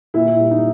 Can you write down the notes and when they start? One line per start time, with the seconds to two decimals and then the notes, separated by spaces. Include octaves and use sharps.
0.14 A#2 E4
0.39 G3
0.51 D#4